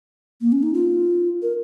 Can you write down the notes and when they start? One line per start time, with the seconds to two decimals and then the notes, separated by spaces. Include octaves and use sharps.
0.41 A#3
0.52 C#4
0.63 D#4
0.74 F4
1.42 A#4